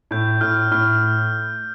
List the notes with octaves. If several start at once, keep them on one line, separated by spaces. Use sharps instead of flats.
A2 G6
A2 F6
A2 F6